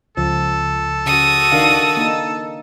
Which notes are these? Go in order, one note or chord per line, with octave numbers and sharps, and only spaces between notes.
C#2 F3 A4
C#3 F#4 D#6
D#3 D4 F5
A#3 D#4